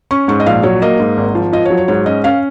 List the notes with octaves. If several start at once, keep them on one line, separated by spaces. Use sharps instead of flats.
C#4 C#6
G#2 C#6
D#5
A#1 F5
F#3 C#5
A#3 D#5
G#2
G#1
F3
F4 D#5
C#5
F#3
C#5
G#2 C#5
C#4 D#5
C#4 F5